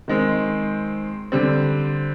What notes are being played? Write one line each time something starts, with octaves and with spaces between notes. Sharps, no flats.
D#3 G#3 C4
D3 G3 C4